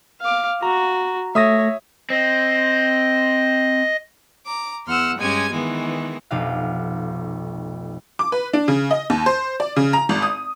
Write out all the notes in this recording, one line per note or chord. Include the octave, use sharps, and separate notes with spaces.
F5 D6
F#4 A#5
A3 C#5 E5 D#6 A#6
C4 D#5
A#5 D6
E2 F#5 C6 E6 F6
G2 G#3 C#4 G4 G#5 G#6
D#3 E3 G#3 B3
F1 B1 F5
D6
B4
D4
C#3
D#5
D#2
C5
D5
C#3
A#5
G#1
D#6